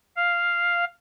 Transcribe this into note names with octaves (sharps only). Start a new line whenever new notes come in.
F5